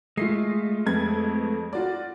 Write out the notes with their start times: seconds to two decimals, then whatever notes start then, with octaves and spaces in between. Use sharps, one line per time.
0.17 G#3 A3 F4 C7
0.86 F2 B4 G#6
1.73 F4 F#4 D5